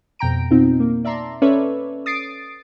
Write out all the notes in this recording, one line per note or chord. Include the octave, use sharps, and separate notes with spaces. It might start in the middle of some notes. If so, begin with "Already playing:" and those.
F2 B2 G5 A#5 D7
B2 C4 D#4 F4
A#3
D5 E5 A5 A#5 C6
C#4 A4 B4 C#5 D5 E5
D#6 A6 C7 D7